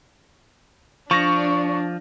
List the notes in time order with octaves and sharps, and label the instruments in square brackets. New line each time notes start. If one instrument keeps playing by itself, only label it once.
[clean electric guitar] F3 [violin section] D4 [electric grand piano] C#6 A#6